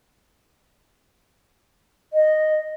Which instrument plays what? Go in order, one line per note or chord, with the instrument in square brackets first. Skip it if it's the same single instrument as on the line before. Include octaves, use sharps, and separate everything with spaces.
[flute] D#5